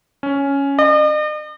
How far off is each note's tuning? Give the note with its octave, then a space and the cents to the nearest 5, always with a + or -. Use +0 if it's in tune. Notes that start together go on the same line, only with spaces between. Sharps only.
C#4 +5
D#5 -45